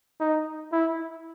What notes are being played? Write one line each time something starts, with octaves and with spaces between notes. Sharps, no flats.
D#4
E4